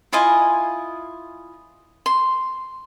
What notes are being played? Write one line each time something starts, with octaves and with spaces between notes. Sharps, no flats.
E4 F4 D#5 G#5
C6